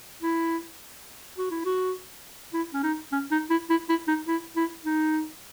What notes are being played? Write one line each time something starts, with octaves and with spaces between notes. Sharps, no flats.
E4
F#4
E4
F#4
E4
C#4
D#4
C#4
D#4
E4
E4
E4
D#4
E4
E4
D#4